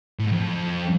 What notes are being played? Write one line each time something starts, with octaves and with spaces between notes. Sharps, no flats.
A2
G#2
F2